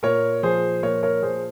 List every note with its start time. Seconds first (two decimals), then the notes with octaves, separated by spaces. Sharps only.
0.03 A#2 A#4 C#5
0.43 F3 G#4 C5
0.83 A#2 A#4 C#5
1.03 A#4 C#5
1.22 A#2 G#4 C5